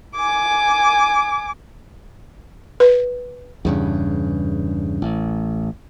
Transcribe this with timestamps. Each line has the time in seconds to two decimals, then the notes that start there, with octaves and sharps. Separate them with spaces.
0.16 G#5 D6
2.80 B4
3.65 E2 G2 C#3
5.02 A1